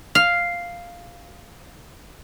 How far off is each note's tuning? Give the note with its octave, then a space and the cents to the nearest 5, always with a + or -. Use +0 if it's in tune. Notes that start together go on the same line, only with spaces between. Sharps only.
F5 +0